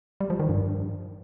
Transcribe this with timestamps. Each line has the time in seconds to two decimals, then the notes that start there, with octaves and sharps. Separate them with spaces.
0.21 G3
0.30 F3
0.40 D#3
0.49 G2